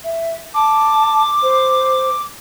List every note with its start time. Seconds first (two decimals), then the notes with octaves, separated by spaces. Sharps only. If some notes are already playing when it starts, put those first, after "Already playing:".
0.04 E5
0.54 A5 D6
1.42 C5